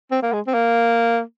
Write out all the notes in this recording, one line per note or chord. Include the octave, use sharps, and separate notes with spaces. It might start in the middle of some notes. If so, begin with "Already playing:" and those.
C4
A#3
G#3
C4
A#3